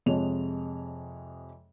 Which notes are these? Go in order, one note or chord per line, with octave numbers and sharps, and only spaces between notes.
F2 C3 G#3 C#5 F7